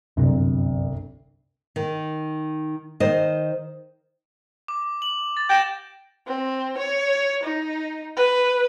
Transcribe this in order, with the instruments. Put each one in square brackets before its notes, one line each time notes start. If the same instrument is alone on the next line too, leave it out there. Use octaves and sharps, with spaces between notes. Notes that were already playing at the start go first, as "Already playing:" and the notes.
[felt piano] G1 C2 [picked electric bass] F#2 F#3
[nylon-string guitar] D#3
D#3 C5 D#5
[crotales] D6
F#7
A6
[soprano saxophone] G5 [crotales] G6 A#6 E7
[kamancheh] C4
C#5
D#4
B4